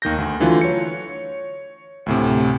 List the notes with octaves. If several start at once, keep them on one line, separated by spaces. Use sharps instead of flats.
D#2 D#3 G6 A#6
D2
D3 E3 F#3 A3 F4
C#5 C#7
D2 A2 C3